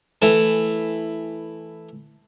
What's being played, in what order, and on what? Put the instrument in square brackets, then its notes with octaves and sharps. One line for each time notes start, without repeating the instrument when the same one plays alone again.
[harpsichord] E3 A3 E4